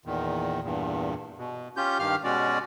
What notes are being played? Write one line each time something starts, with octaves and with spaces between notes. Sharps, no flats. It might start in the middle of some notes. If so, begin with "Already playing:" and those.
E2 A#2 D#3
E2 G2 A#2
B2
C#4 F4 G4 G6
G2 D#3 G4 F5 F6
B2 G#3 C#4 F#4 D5